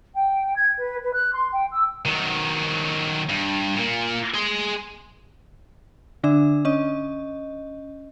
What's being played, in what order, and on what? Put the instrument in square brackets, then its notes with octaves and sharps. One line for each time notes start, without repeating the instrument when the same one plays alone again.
[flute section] G5
G#6
B4
B4
F#6
C6
G5
E6
[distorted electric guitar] D#3 F#3
G2
A#2 A#3
G#4 C6
[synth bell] D3 D4 E5
C#4 D#5